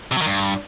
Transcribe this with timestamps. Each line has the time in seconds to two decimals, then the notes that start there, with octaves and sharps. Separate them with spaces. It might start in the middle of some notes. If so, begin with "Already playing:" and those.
0.12 C3
0.17 F#3
0.22 D#3
0.27 G2